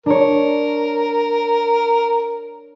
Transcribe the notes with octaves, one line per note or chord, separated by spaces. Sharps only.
D4 A#4 C#5